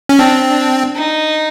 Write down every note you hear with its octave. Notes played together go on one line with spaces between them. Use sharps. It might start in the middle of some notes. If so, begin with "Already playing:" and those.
C#4
C4 D4
D4
D#4